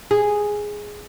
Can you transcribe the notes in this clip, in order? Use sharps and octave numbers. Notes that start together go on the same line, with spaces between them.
G#4